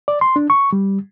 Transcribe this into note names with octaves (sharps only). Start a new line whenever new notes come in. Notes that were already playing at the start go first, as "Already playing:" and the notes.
D5
C6
D4
C#6
G3